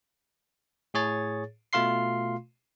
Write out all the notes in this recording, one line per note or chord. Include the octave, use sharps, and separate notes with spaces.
A2 G#4 C#5 A6
B2 A3 F4 F5 C6 C7